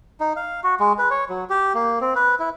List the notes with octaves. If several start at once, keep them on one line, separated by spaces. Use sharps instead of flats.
D#4
F5
F#4
G#3
B4
C#5
F#3
G4
A#3
C4
B4
E4